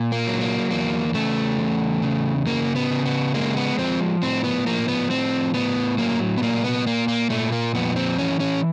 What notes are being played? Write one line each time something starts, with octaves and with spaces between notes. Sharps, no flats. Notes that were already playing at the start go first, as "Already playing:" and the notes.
Already playing: A#2
A#3
F#3
A#3
E2 A#3
C#3 A3
E2
C#3
C#3 A#3
B3
C#3
B3
G#3 A#3
B3
F3 C4
A2 C4
B3
F3 A#3
B3
A2 C4
A2 B3
F#3 A#3
B3
A#2 A#3
B3
A#2 A#3
A#3
A#2 A3
A#3
F2 B3
C4
E3 C#4
C#4